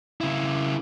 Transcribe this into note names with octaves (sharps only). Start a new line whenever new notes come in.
C#3 E4